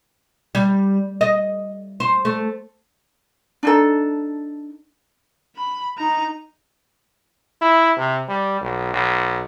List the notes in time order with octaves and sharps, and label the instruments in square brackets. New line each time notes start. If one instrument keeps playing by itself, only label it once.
[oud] G3
D#5
C5
A3
[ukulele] D4 D#4 A4
[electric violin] B5
D#4 A#5
[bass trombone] E4
C3
G3
B1
B1